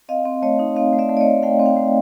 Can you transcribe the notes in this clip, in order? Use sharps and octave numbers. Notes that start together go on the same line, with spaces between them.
C4 D#5 F5
C4
A3 C#5 D#5
D#4
C4 D#5 F5
A3
D5 E5
A3
D5
C#5 D#5
A3
A3 F5 G5
C4
F5 G5
A3